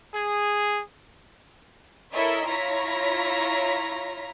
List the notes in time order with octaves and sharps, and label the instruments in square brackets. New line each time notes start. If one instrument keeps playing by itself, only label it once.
[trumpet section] G#4
[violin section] E4 A4 A#4 C#5 D#5 E5
E4 F4 C#5 A#5 A#6 B6